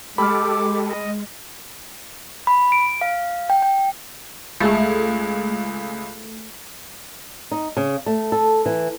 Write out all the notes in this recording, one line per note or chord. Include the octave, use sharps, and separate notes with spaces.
G#3 G4 A4 B5 D6 F6
D#5
B5
D7
F5
G5
G5
C#2 G#3 A3 G#4
D#4
C#3
A3
A4
E3